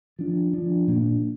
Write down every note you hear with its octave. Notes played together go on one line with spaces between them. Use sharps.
F3 D4
F3 D4
A#2 A#3 D4